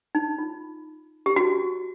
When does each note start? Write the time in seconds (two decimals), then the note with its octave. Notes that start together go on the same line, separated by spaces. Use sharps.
0.15 D#4
0.39 F4
1.26 G4
1.36 F#4